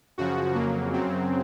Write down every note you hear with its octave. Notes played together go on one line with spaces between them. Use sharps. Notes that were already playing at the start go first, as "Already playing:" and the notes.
F#2 C#3 F3 F#4
F2 C#3 F#3 A#3
F#2 C#3 F#3 C4